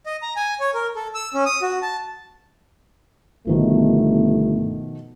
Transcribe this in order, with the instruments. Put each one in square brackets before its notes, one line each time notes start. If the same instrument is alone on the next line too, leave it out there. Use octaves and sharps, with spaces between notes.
[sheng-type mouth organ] D#5
A#5
G#5
C#5
A#4
A4
E6
C#4
D#6
F#4
A5
[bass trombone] G1 [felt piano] B2 D#3 F3 [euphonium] A3